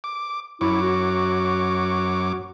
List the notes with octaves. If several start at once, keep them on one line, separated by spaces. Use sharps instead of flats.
D6
F#2 E4 C#5 D6
F#4